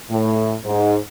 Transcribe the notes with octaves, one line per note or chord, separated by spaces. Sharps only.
A2
G#2